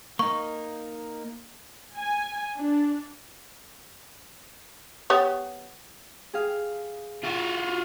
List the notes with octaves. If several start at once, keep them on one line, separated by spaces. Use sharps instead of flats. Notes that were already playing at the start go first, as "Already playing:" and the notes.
A#3 D#4 C#6
G#5
D4
B3 G4 C#5
G#4 F5
F4 F#4